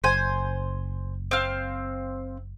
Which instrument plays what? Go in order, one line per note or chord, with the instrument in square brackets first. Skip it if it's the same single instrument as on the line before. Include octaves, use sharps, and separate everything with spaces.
[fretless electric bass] F#1 [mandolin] C5 G#5
[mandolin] C4 F5